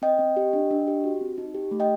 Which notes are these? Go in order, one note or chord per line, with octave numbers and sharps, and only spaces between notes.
C4 D#5 G5
C4
G4
D4
D4
G4
F#4
C4
D#4
G4
A3
D#5 G5